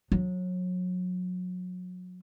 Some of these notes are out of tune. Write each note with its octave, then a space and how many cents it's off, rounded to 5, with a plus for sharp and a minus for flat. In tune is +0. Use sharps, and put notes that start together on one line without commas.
F#3 -30